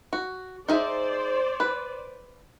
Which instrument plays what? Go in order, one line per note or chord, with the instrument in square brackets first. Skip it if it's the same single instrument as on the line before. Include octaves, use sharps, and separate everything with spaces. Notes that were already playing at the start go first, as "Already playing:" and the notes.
[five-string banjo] F#4
[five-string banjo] D#4 G#4 E5 [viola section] C5 D5
[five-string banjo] B4